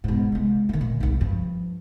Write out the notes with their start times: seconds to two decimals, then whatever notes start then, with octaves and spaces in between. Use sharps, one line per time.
0.04 G#2 B2
0.32 C2 G#3
0.69 D#3 A3
0.81 A#2
1.00 C2 D#4
1.21 G2 F3